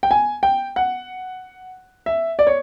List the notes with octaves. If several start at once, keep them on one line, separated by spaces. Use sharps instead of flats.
G5
G#5
G5
F#5
E5
D5
C#5